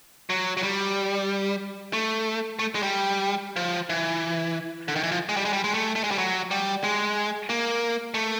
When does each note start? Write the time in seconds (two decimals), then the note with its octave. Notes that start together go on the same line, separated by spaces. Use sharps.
0.30 F#3
0.57 F#3
0.63 G3
1.93 A3
2.59 A3
2.75 G#3
2.83 G3
3.56 F3
3.89 E3
4.88 D3
4.96 D#3
5.03 E3
5.12 F3
5.29 G#3
5.37 G3
5.45 G#3
5.53 G3
5.64 G#3
5.74 A3
5.96 A3
6.04 G#3
6.11 G3
6.18 F#3
6.51 G3
6.84 G#3
7.50 A#3
8.14 A3